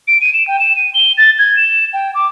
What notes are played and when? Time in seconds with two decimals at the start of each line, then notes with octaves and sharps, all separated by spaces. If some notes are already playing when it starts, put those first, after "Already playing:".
0.08 D7
0.21 D#7
0.34 E7
0.48 G5
0.60 E7
0.76 D#7
0.94 G7
1.18 A6
1.39 G#6
1.57 E7
1.93 G5
2.15 D6